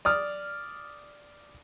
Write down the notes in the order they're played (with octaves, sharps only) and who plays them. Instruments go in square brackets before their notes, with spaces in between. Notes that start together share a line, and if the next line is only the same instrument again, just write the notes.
[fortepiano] D5 D#6 F6